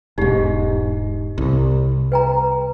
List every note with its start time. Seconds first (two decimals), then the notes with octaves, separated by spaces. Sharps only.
0.18 E1 G#2 D#4 G4
1.38 C2
2.12 B4 G5 A#5